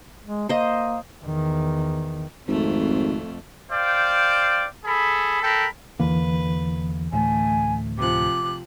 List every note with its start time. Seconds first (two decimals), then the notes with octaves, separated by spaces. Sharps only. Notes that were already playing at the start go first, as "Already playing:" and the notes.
0.25 G#3
0.49 A#3 C5 D#5
1.24 E2 D#3
2.48 G#1 F2 A3
3.71 C5 D5 F5 G5
4.85 G#4 A4 B5
5.43 A4 A#4 G5 B5
6.00 E2 D3 E3 A#3 B4
7.12 D2 A2 A3 G#5
7.98 C3 F3 D6 F#6